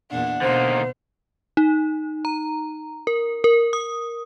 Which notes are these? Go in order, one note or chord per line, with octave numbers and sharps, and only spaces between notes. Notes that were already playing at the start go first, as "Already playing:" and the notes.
E2 A#2 D4 F#5
B2 D3 A#3 D#4 C5
D#4
A#5
A#4
A#4
D#6